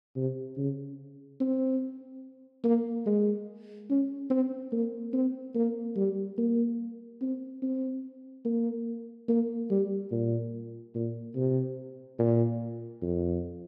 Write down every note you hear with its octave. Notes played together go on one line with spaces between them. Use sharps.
C3
C#3
C4
A#3
G#3
C#4
C4
A#3
C4
A#3
G3
A#3
C4
C4
A#3
A#3
G3
A#2
A#2
C3
A#2
F2